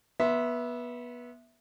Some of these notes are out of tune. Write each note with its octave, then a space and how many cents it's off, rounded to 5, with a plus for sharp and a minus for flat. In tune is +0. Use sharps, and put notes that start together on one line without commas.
B3 -20 E5 +0 C6 +0